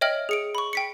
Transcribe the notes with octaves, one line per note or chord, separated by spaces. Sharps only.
C#5 D#5 E5 G5 F6 F#7
G#4 C#7 D7
B5 C#6
G5 B6 C#7